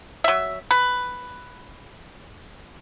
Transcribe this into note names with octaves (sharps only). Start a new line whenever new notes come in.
F#3 E5
B4